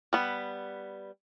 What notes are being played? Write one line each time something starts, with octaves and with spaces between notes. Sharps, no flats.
G3 B3